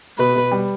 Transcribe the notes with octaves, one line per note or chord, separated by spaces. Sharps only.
B2 B4
B2
G3